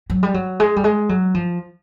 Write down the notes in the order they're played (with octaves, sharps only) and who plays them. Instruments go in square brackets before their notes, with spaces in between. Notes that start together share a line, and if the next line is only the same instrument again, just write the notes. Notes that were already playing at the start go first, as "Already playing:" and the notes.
[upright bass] F#3
G3
F#3
G#3
G3
G#3
F#3
F3